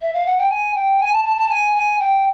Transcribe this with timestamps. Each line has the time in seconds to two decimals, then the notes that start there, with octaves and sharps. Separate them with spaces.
0.02 E5
0.13 F5
0.26 F#5
0.38 G5
0.49 G#5
0.74 G5
1.00 G#5
1.12 A5
1.24 A5
1.37 A5
1.49 G#5
1.74 G#5
1.99 G5